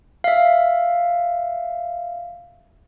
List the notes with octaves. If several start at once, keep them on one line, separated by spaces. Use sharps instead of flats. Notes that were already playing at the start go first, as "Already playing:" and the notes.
E5 F5